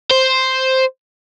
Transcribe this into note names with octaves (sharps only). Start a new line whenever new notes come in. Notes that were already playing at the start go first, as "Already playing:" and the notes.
C5